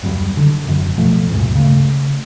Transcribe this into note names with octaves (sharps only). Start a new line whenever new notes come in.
D#1 F#2 A2 G3
D3
E1 F#2
C#2 B2 F3 A3
D1 G2 B2 G#3
C#3 A3